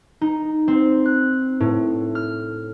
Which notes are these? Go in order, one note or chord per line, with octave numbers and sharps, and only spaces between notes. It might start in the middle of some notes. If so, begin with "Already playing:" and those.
D#4
C4
F#6
A2
F6